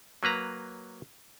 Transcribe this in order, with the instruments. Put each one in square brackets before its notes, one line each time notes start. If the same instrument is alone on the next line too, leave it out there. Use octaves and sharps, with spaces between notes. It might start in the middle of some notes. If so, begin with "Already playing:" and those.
[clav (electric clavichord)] F#3 A#3 B4 A#5